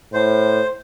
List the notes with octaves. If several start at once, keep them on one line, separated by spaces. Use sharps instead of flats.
A2 C5